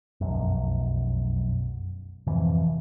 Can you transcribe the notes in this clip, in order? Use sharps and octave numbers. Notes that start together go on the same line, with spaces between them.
F1 B1 F#2
G#1 F2 C3 E3